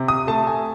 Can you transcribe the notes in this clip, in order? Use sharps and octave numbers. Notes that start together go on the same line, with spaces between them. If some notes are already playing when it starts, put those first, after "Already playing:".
Already playing: C3
D#6
A3 A5
G#5